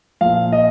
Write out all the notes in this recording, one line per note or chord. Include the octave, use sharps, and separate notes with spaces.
A#2 F3 F5
D#5